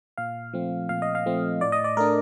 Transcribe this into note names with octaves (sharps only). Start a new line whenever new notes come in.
A#2 F5
F3 A3 C4
A#2 F5
D#5
F5
F3 A3 C4
A2 D5
D#5
D5
A3 D4 A#4